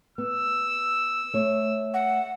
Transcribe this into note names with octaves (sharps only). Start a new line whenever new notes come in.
B3 E6
A3 C#5
F#5